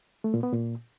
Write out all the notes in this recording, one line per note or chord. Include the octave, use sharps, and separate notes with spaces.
A3
A#2
B3
A#2